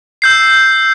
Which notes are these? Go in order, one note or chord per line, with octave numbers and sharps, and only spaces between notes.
E6 G6 C7